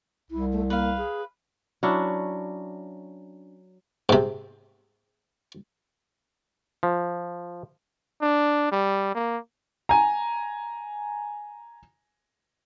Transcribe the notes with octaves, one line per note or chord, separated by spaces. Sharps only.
C2 E4
A3
A#3 B4 F5
G#4
F#3 C#4 D4 E4
G#2 C3
F3
D4
G3
A#3
G#5 A#5